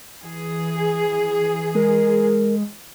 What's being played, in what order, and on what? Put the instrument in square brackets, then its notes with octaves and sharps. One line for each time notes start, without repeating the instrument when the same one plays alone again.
[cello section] E3 G#4
[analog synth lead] G#3 [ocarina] A#4